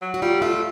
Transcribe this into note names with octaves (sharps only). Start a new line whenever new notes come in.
F#3
F#4
G3 F4
A3 F4